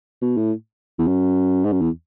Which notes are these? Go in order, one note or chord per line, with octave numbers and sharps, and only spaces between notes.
B2
A2
E2
F#2
G#2
F#2
E2